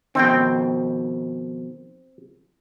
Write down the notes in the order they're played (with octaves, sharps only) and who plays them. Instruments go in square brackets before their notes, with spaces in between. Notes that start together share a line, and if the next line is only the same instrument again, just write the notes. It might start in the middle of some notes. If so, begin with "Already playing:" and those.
[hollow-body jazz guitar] F2 B2 D#3 [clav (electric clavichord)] C4 G5